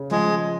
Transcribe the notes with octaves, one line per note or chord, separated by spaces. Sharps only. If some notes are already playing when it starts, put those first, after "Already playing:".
Already playing: C#3
F3 G#3